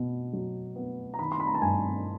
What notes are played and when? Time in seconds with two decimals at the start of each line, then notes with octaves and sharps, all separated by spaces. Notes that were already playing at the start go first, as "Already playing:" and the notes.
Already playing: B2
0.33 F#3
0.76 B3
1.14 A#5
1.19 D#3 B5
1.32 C6
1.40 B5
1.47 A#5
1.55 A5
1.62 G2 G#5